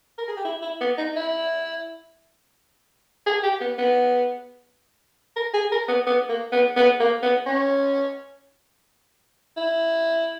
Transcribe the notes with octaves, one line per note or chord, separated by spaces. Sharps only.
A#4
G#4
G4
E4
E4
B3
D#4
E4
G#4
G4
B3
B3
A#4
G#4
A#4
B3
B3
A#3
B3
B3
A#3
B3
C#4
E4